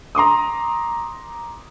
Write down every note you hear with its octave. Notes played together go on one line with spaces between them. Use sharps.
A#5 C6 D6 D#6